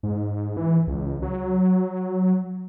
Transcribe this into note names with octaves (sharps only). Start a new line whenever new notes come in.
G#2
E3
C#2
F#3